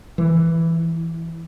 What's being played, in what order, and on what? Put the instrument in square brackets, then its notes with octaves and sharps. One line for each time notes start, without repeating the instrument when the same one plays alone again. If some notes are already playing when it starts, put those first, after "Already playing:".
[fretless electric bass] E3